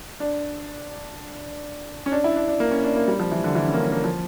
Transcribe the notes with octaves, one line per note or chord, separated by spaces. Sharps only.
D4
C#4
D4
E4
D4
D4
A#3
C#4
D4
A#3
G3
F3
E3
D3
E3
C#4
A#3
C#4
A#3
F3